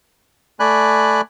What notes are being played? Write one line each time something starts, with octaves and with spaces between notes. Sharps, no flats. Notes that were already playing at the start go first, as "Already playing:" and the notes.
A3 D5 G#5 B5 F#6